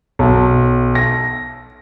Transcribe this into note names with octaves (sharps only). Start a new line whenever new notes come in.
B1
A#6